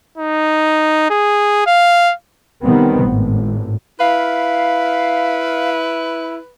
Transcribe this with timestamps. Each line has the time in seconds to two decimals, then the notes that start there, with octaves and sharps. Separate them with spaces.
0.17 D#4
1.10 G#4
1.67 F5
2.63 D#3 G3 B3 C4
3.05 G#1 A2
4.00 E4 B4 F5